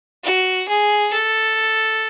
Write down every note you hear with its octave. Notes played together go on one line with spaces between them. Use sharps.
F#4
G#4
A4